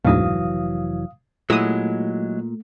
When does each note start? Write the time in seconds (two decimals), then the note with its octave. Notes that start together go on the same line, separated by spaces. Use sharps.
0.05 F1 D2 G#2 B2 E3 F#3 F5 D#6
1.50 A#2 F#3 G#3 A3 E4 D#6 E6